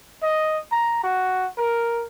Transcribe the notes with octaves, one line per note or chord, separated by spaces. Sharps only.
D#5
A#5
F#4
A#4